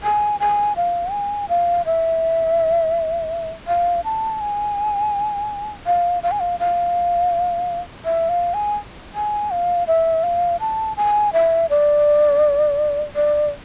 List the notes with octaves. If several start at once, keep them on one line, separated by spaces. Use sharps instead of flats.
G#5
G#5
F5
G#5
F5
E5
F5
A5
G#5
F5
F5
G#5
F5
F5
E5
F5
G#5
G#5
F5
E5
F5
A5
G#5
E5
D5
D5